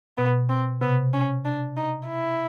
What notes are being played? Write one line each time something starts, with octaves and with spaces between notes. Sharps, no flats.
B2 B3
C4
C3 B3
C#4
D4
D#4
E4